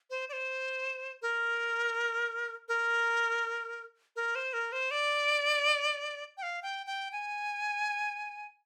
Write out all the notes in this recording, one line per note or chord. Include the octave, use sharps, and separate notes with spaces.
C5
D5
C5
A#4
A#4
A#4
C5
A#4
C5
D5
G5
F5
G5
G5
G#5